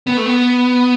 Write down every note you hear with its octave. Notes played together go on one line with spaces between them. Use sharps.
B3
A3
B3